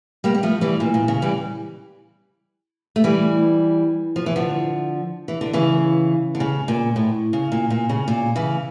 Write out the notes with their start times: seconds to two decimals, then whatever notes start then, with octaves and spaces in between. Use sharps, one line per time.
0.24 G3 A#3
0.34 G3
0.43 F3 A3
0.61 E3 G3
0.80 A#2
0.94 A#2
1.08 C#3
1.22 E3 G3
2.96 A3
3.04 E3 G3
4.16 F3
4.26 E3
4.36 D3 F3
5.28 E3
5.41 D3
5.53 C#3 E3
6.35 D3
6.40 C#3
6.68 A#2
6.96 A2
7.33 C#3
7.52 A#2
7.70 A#2
7.89 C#3
8.08 A#2
8.36 C#3 E3